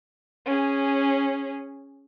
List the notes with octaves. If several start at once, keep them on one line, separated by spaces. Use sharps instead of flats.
C#4 G#4